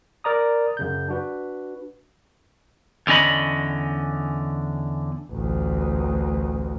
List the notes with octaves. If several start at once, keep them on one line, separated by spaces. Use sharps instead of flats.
A#4 D5 A#5 D#6
F#2 C#3 G6
D4 F#4 B4
E2 D3 C#4 D#5 B5
A1 D2